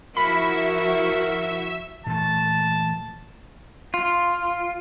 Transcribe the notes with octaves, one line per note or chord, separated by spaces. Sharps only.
F3 E4 F#4 A#4 E5 B5
A#2 E3 A3 A5
F4